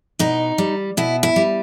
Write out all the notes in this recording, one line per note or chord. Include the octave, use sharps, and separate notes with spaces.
B2 D#4
G3
B2 E4
E4
G3